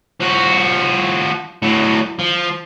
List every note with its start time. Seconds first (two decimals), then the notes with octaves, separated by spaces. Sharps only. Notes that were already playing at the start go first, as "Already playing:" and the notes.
0.20 F3 F#4
1.62 A2 F#3
2.19 F3